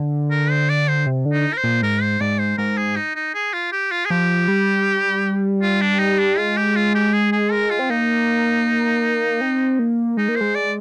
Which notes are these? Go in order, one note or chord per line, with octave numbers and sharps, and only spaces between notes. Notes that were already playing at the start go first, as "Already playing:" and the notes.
Already playing: D3
A#4
C5
D5
C5
C3
D3
D#4
A#4
C5
A#2
G#2 A#4
C5
G#2 D5
C5
G#2 A#4
G#4
D#4
D#4
G#4
F4
G4
F4
G#4
F3 G4
G3
F4
D4
D#4
D4
G#3 F4
G4
F4
G4
G#4
G#4
A#4
F4
C4
A#3 D#4
C4
A#3
G#3 D#4
A#3
G#3 C5
D5